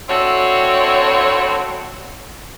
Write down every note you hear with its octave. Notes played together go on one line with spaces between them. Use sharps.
C4 D4 E4 F#4 A4 C#5